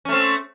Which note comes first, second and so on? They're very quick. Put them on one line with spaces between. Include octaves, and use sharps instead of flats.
C#4 A3 C4